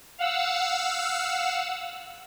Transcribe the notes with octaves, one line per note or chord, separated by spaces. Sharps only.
F5 F#5 E6